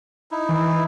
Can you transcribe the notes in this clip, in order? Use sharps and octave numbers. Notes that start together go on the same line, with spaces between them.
D#4 E4
E3